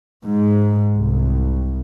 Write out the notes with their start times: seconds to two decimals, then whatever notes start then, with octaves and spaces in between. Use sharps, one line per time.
0.24 G#2
0.94 C2